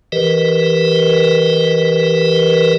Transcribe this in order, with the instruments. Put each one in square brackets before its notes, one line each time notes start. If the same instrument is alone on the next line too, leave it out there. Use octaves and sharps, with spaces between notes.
[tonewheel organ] E3 G4 A#4 B4 D#5